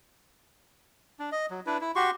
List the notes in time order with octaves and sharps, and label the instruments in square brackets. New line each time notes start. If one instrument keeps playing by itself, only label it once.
[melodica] D4
D#5
F#3
D4 E4 B4
E4
F#4 G4 C6 C#6